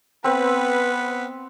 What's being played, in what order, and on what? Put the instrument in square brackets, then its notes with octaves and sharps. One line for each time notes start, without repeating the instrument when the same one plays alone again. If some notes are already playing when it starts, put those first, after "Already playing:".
[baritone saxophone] B3 [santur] C4 [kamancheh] B4